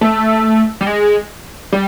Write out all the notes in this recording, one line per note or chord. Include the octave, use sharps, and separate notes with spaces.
A3
G3
G#3
G3